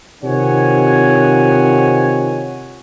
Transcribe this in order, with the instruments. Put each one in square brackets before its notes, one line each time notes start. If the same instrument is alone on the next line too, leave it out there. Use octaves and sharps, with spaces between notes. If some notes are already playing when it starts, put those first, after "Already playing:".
[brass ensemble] C3 D#3 F4 C#5 F#5 G#5